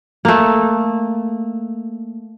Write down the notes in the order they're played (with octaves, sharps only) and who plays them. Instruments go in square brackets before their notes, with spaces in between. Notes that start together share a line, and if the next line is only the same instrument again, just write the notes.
[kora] A3 A#3